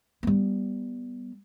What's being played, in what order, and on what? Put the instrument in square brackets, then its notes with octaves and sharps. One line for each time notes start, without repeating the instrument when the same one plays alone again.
[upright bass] G3 B3